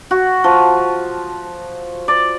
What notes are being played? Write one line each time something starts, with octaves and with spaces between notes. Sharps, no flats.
F#4
F3
D5